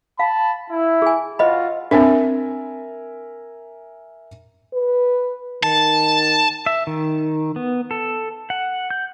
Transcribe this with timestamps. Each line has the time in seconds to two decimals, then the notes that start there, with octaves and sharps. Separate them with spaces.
0.19 F5 A5 B5
0.71 E4
1.02 G#4 G#5
1.39 F4 F#4 C5 D#5 B5
1.91 C4 D4 A#4 E5 G#5
4.73 B4
5.63 D#3 A5
6.66 E5
6.87 D#3
7.56 B3
7.91 A4
8.50 F#5
8.90 G6